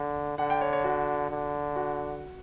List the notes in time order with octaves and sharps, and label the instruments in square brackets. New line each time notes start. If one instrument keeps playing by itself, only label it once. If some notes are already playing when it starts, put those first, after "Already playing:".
Already playing: [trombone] D3
[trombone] D3 [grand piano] F#5
[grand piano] G5
C#5
C#5
F#4
[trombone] D3
[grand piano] F#4